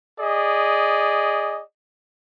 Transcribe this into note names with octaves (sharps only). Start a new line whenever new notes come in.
G#4 D5 D#5